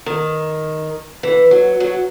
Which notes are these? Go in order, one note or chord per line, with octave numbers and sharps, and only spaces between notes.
D#3
E3
F#3
F#3